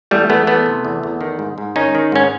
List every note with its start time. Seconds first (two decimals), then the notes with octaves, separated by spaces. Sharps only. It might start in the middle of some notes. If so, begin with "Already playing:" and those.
0.11 E2 G3 A3
0.29 E2 A3 B3
0.47 E3 A3 B3
0.66 C3
0.85 E2
1.03 E2
1.21 D#3
1.39 G#2
1.58 G#2
1.76 D#3 C#4 D#4
1.95 D#3
2.12 G#2 C#4